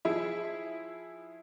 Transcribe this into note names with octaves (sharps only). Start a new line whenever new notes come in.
F3 E4 G#4 E5